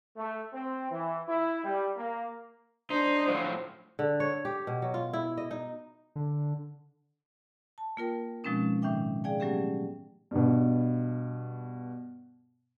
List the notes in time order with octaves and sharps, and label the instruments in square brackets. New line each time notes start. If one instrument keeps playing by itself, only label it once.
[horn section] A3
C4
E3
E4
G3
A#3
[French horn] D4 [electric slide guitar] D#4 [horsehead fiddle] C5
[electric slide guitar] A2 F3 F#3
[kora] D3
C#5
G4
B2
F#3
F4
E4
D#5
D#4
[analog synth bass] D3
[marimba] A5
A#3 F4 A#4 G5
B2 F3 G#3 C4 C#4 D#4
A2 D#3 D#4 E5 G5 D6
G#4 D5 F5 G5 G#5
F#3 A3 B3 C#4 G4 G#4
[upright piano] G2 B2